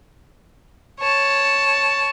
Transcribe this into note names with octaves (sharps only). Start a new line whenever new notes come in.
C#5 A5